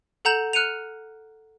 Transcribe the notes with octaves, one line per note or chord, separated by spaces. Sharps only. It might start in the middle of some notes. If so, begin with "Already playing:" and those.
A4 F#5 A#5 G6 E7 F#7
F6 F#6 C#7 D#7 F7